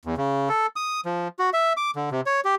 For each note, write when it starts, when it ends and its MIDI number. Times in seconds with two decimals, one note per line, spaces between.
0.05 0.15 40
0.17 0.49 49
0.49 0.67 69
0.76 1.01 87
1.05 1.28 53
1.39 1.50 66
1.54 1.73 76
1.77 1.91 86
1.96 2.09 50
2.11 2.21 48
2.26 2.40 73
2.45 2.55 67